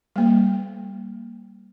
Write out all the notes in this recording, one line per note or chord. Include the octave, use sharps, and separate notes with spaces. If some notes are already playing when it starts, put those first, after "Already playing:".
G3 A#3